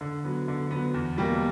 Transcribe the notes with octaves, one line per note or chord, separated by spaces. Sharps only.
D3
F#3 B3
D3
F#3 B3
E2
B2 G3 A#3